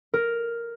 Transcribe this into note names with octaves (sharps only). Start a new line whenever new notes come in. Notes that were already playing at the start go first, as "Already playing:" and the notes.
A#4